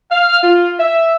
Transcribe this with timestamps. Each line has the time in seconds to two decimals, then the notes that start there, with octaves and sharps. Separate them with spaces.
0.11 F5
0.42 F4
0.78 E5